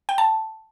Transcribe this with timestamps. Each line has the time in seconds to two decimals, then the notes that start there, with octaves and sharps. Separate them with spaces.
0.09 G5
0.18 A5